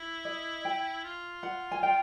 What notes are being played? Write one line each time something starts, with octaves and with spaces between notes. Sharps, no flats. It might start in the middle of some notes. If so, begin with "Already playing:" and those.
Already playing: E4
D#5
G5
F4
F#5
G#5
G5